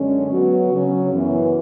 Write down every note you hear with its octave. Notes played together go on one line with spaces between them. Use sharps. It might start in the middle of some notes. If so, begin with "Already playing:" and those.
Already playing: F#2 D3 G#3 C#4
F#3 B3 F#4
C#3 F#3 C#4
F#2 E3 B3